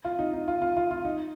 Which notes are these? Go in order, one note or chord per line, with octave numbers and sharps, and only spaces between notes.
F4
D#4
D#4
F4
F4
F4
F4
D#4